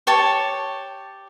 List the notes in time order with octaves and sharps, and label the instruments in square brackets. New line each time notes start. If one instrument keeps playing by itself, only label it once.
[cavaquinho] G4 C#5 A5 C#6